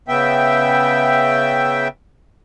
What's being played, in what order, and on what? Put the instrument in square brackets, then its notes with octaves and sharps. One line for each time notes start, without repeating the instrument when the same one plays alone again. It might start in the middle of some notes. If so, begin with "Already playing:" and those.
[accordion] C#3 B3 E5 G5